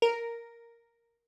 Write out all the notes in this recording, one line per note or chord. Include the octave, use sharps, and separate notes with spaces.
A#4